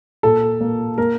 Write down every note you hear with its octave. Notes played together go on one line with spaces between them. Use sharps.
A#2 A4
A#3
A#3 A#4